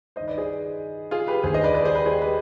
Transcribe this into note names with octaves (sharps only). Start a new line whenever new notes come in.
G2 D#3 C5 D#5
B4 D5
G#4 C5
F4 G#4
G4 B4
D#2 D3 G#4 C5
C5 D#5
B4 D5
B4 D5
G#4 C5
G4 B4
G#4 C5
G4 B4